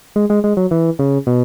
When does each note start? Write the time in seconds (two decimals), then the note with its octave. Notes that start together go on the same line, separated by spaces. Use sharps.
0.16 G#3
0.30 G#3
0.44 G#3
0.57 F#3
0.71 E3
0.99 C#3
1.27 B2